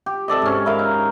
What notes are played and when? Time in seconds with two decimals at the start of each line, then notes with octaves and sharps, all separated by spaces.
0.06 G4
0.28 C3 A4 D5 D#5
0.42 G#2 C#4
0.66 E4 A#4 F5
0.79 D#4